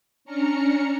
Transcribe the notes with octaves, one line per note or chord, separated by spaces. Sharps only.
C#4 D4 A#5 F6 C#7